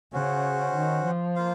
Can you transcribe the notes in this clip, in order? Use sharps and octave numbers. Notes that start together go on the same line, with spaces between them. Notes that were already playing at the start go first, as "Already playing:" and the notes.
C#3 C#4 F#4 C5 F#5
D#3
F3
A#3 F4 C5 F5